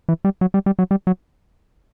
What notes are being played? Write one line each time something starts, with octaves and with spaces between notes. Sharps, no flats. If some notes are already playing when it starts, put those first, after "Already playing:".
E3
G3
F#3
G3
G3
F#3
G3
F#3